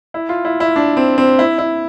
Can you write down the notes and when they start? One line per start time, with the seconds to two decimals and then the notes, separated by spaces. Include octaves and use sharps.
0.14 E4
0.29 F4
0.45 E4
0.60 E4
0.76 D4
0.97 C4
1.18 C4
1.39 E4
1.58 E4